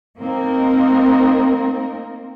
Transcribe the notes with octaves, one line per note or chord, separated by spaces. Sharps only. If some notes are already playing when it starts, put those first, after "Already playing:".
A3 A#3 C4 D#4 A#4